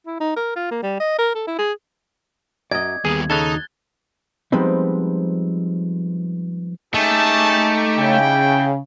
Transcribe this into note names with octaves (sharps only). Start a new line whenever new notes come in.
E4
D#4
A#4
F4
A#3
G3
D#5
A#4
A4
E4
G#4
F#2 D5 D#5 G#6
D#2 G3 B3 G#4
C#3 D#4 A4 F#6 A6 G7
F3 G3 G#3 B3 C4 D#4
A3 C#4 D#4 G4 G#4 A5
C#3 E4 G5